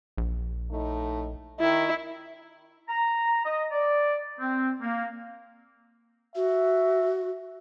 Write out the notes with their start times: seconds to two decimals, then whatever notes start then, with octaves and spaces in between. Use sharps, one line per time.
0.18 A#1
0.71 A2 A3 D#4
1.60 D#3 E4
2.89 A#5
3.45 D#5
3.72 D5
4.40 C4
4.82 A#3
6.36 F#4 E5